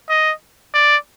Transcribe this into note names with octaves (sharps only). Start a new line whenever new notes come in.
D#5
D5